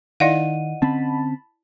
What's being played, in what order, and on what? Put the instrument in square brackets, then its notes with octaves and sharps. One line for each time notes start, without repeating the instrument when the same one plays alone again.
[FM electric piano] D#3 [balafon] E4 D5 F5 [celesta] D#5 F#5 D#7
[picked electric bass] D3 C4 C#4 [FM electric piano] A5 B5